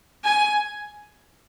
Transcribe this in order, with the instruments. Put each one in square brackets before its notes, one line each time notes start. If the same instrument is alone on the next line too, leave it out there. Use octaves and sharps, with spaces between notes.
[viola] G#5